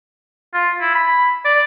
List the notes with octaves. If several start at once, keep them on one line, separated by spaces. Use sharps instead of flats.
F4
E4
B5
D5